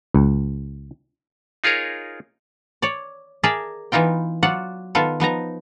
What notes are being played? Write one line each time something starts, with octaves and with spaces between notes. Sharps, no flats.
C#2
D#4 F4 G#4 A#4 C#5
C#5 D5
G#4 A#4 D5 E5 A5
E3 B3 D#4 F4 G5
F#3 F4 D5 F#5
D#3 B3 F4 A4
F3 B3 D#4 A#5